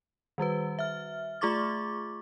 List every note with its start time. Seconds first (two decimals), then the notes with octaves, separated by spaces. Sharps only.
0.38 D#3 G3 F#4 B4
0.79 E5 F6
1.41 A3 F4 G#4 C#6 D6 A6